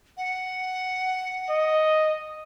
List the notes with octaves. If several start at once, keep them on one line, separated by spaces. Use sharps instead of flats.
F#5
D#5